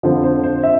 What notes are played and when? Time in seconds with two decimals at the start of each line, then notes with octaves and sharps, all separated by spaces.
0.03 F2 D3 F3 C5
0.24 C5
0.44 C5
0.63 E5